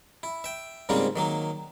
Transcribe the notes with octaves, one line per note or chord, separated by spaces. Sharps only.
E4
E5 G5
G#2 C#3 G3 A#3 C4 F4
D#3 F#3 A#3